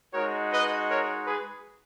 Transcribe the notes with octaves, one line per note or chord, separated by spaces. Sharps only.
G#3 D#4 F#4 A#4 C#5
B4 D#5
A#4 C#5
G#4 B4